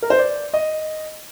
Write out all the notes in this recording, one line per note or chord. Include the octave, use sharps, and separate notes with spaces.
A#4
C5
D5
D#5